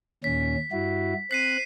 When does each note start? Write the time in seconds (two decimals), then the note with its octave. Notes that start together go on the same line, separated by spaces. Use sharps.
0.24 D#2 A#2 C#4 B6
0.72 G2 E4 F#4
1.31 C4 F#6 B6 C7 D#7